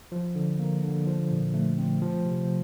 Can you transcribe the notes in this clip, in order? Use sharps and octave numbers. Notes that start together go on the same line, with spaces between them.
F3
D3
A#3
D3
F3
A#2
A3
C4
F3
C3